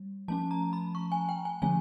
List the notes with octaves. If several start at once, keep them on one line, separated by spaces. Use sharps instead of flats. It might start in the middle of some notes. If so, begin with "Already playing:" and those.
Already playing: G3
F3 A3 C#4 A5
A#5
B5
C#6
G#5
G5
G#5
D3 F3 A3 C#4 G#5